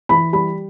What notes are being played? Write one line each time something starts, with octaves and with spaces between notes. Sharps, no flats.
E3 B5
G3 B5